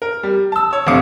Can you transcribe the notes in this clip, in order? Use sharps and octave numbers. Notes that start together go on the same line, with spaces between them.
A#4
G3
A5 E6
C#5 E6
G1 C3 A3 F5 D6 C#7